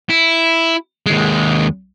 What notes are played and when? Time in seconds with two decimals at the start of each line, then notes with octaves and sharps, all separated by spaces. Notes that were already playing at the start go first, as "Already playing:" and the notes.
0.10 E4
1.06 D#2 G#3